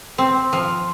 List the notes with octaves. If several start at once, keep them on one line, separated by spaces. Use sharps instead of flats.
C4
F3